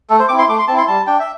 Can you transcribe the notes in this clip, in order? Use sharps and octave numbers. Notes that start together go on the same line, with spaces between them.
A3 A4
C5
C4 E4 D6
C6
A3 D6
C6
C4 E4 A5
C6
G3 A5
D4 G5
E5